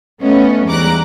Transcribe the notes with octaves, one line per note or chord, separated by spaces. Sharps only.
A3 B3 C#4 D#5
E2 G#2 G3 A#5 D6 F#6